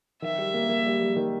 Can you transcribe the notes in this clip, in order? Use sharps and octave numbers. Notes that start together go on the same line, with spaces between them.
D#3 E5
G3
A#3
A#3
G3
G3
D#3